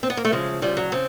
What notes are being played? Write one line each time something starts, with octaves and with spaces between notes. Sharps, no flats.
C4
B3
A#3
A3
D2 C#3 F3 G#3
D2 C#3 F3 G3
F#3
C#3 C4